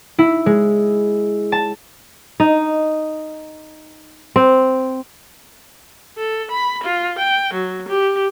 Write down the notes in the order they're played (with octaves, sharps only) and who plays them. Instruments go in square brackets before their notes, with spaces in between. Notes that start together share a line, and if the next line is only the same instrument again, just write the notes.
[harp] E4
G#3
A5
[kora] D#4
C4
[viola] A4
B5
F4
G5
F#3
G4